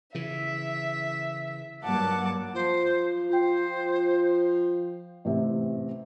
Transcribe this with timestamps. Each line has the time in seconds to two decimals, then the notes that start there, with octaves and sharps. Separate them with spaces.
0.15 C#3 E3 E5
1.84 G2 F#3 A#3 F#5 A5 D6
2.54 F3 C5
3.30 F4 C5 G5
5.25 A1 C3